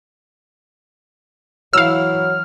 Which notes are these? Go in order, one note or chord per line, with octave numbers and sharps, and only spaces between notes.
E3 F#3 E4 F5 E6 F6